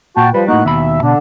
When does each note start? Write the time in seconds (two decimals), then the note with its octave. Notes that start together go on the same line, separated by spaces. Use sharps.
0.17 A#2 F#4 G5 A5
0.34 F3 G3 B4
0.48 A2 A#3 D#4 F#4 F#6
0.65 D#2 B2 E5 B5
1.03 B2 D3 D4